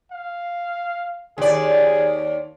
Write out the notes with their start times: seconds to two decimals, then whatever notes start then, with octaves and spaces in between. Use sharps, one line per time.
0.12 F5
1.38 D#2 G#4 D5